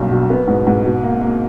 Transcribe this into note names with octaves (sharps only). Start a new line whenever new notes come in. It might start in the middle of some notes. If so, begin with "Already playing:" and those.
Already playing: B1 G2 A#3
B2
B3
G#2
G#2
B2
A#3
A#3